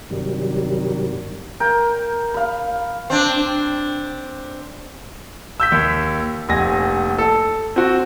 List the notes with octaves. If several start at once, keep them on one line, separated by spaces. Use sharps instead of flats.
G2 C3 D#3 F#3 G3
A#4 G5
F5 B5
C4 D4
E6 G6 B6
D#2
F1 A#1 G#5 A#6
A4
C4 F#4